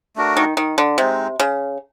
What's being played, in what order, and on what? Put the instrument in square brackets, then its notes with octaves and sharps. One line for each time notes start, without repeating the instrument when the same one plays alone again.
[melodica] A3 D4 F#4 A#4
[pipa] D#3
D#3
D3
[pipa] C3 [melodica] G#3 C4 D#4
[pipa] C#3